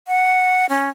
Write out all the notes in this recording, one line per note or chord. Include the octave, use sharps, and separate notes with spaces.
F#5
C#4